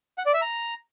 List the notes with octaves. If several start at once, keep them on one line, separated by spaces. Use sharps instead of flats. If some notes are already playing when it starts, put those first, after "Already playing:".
F#5
D5
E5
A#5